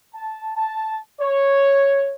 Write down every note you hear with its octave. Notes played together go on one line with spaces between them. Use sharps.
A5
A5
C#5